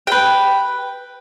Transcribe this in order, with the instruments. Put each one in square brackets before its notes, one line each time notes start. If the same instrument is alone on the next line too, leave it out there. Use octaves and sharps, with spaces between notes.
[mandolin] B4 G5